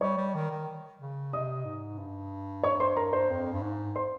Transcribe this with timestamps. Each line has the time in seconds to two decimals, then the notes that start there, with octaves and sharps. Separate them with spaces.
0.01 G3 C#5 C#6
0.18 G3
0.35 D#3
0.51 D#3
1.00 C#3
1.33 C3 D#5 D#6
1.65 G#2
1.98 G2
2.63 C#5 C#6
2.80 C5 C6
2.97 A#4 A#5
3.13 C5 C6
3.30 F2
3.53 G2
3.62 G#2
3.96 C5 C6